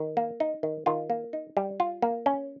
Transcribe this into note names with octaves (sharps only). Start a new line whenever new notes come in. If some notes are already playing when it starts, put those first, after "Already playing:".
Already playing: D#3
A#3
D#4
D#3
D#3 F4
A#3
D#4
G3
F4
A#3
C#4